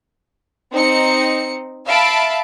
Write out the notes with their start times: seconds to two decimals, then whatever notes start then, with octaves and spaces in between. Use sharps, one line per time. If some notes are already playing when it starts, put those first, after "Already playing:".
0.72 C4 D#4 C#7
1.86 E5 F5 A5 B5 D7